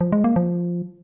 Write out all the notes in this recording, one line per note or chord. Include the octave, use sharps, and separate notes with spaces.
F3
G#3
A#3
F3